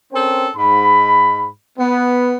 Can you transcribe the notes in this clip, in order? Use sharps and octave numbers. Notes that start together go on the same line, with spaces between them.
C4 C#4 A4 A#4 C5 G5
G#2 B5
B3